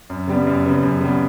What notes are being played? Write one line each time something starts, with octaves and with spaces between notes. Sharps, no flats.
F#2
C#3 G3 B3
F#2
C#3 G3 B3
F#2
C#3 G3 B3